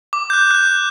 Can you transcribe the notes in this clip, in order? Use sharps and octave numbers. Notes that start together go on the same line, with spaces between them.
D6
G6
F#6
F#6
G6